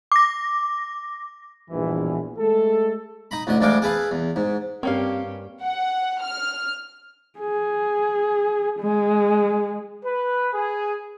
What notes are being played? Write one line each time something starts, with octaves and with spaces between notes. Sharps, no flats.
D6 A#6
A#1 E2 G2 B2 E3
G#3 A3 G#4 A4
D#4 A#5 B5
A1 D2 D3 D#5
D2 A2 G#3 D4 F5 G5
G#4 A4 B4 F5
E2
G#2
G2 A#3 C4 C#4 G4 F5
F#5
F6
G#4
G#3
B4
G#4